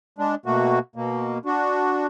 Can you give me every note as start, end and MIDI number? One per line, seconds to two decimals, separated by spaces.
0.19 0.35 56
0.19 0.35 62
0.46 0.79 47
0.46 0.79 57
0.46 0.79 58
0.46 0.79 66
0.96 1.38 47
0.96 1.38 58
1.45 2.07 62
1.45 2.07 66